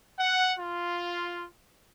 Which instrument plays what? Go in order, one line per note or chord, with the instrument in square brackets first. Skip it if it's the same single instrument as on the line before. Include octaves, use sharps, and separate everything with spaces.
[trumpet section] F#5
F4